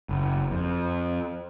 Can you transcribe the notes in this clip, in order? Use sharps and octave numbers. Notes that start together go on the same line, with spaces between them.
F#1
F2